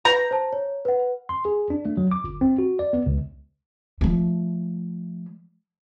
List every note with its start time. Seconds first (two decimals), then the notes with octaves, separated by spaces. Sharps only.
0.05 B4 A#5 G6 A#6
0.31 C5 A5
0.53 C#5
0.85 B4 F#5
1.29 C6
1.45 G#4
1.70 D4
1.85 A3
1.97 F#3
2.11 D6
2.24 G1
2.41 C4
2.58 F#4
2.79 D5
2.93 B3
3.06 C#2
4.01 F3 A3